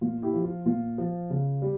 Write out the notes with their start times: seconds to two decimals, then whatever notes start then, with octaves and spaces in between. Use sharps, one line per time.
0.01 A#2 F4
0.22 E4 G4
0.34 F3
0.44 F4
0.66 A#2 F4
0.98 F3
1.30 C#3
1.62 G3